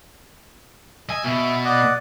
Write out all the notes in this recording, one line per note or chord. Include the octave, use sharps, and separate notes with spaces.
D#5 G#5 E6
B2 E5
D5 D#5 F#5